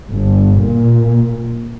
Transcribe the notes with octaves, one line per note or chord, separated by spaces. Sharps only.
G1
A#2